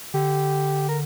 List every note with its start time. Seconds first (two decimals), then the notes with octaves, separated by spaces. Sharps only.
0.14 D3 G4
0.89 A#4